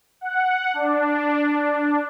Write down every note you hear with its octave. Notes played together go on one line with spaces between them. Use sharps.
F#5
D4